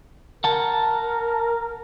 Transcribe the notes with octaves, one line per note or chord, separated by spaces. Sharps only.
A#4 F#5 A5